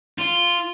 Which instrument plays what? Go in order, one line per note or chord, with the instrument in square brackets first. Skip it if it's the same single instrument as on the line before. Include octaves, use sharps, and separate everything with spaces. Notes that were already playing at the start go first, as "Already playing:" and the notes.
[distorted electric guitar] F4